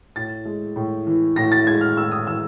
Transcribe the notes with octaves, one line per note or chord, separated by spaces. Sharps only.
A2 A6
G#3
A2
E3
A2 A#6
A6
G#3 G#6
F6
A2 E6
D#6
E3 E6